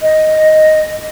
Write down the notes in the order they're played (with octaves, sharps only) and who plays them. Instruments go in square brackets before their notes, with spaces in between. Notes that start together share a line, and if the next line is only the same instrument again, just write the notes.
[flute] D#5